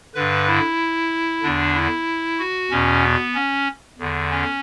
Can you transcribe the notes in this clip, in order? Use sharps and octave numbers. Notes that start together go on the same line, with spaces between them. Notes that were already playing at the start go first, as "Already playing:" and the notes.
G2 D3 B4
E4
E2 D3 D4
E4
F#4
E2 B2 C#4
B3
C#4
E2 D3
C#4